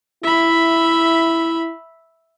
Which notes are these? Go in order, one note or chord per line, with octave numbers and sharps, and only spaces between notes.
E4 E5 B5